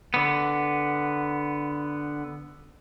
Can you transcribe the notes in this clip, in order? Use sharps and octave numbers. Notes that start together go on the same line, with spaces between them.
D3 B3